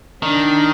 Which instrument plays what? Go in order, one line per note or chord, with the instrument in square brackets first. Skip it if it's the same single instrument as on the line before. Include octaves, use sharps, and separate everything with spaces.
[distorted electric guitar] D#3 [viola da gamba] D4